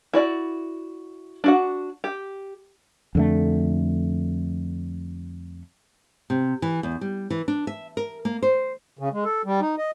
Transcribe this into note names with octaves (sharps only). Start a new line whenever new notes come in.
E4 F#4 D5
D4 F#4 F#5
G4
F2 D3 A3
C3
E3
E2
G3
E3
D4
E5
A#4
A#3
C5
C#3
G#3
A4
G3
D#4
D#5